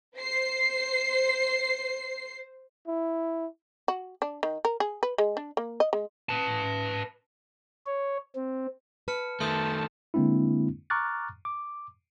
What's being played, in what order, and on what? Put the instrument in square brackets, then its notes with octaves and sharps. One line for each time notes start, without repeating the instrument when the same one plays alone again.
[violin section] C5 C7
[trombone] E4
[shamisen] F#4
D4
D#3
A#4
G#4
B4
G#3
D4
A#3
D#5
G#3
[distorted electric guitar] B4 A5
[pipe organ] C#5
C4
[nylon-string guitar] B4 [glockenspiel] A5 F6 C#7
[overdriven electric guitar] D#3 A3 [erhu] A5 [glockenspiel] C6 D#6 G6
[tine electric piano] D3 G#3 A#3 C4 D4 E4
A#5 C#6 D6 F6 F#6 A6
D6